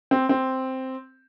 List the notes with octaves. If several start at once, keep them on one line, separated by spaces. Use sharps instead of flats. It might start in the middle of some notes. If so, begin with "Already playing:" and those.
C4
C4